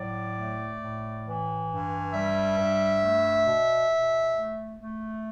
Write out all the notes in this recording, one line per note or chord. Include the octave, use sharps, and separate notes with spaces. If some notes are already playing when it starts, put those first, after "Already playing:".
Already playing: A2 F#3 D5
A3
A2
E3
G2
G3 E5
G2
A3
B2
B2
A3
A3